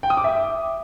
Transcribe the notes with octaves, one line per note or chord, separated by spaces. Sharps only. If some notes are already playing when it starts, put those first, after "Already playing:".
G5
D#6
D6
E5